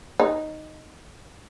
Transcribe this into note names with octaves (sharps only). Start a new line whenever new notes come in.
D#4